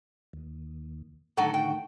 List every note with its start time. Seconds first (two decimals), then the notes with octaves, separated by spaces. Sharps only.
0.33 D#2
1.37 A2 D3 D#3 F#3 F#4 A4
1.54 G5